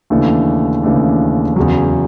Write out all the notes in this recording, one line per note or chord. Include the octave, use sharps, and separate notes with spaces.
D#2 C#3 E3 A3 D4
D#2 C#3 E3 A3 D4
E2 C#3 F#3